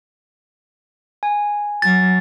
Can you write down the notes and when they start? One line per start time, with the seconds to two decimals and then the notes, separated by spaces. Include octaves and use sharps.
1.23 G#5
1.82 F#3 A6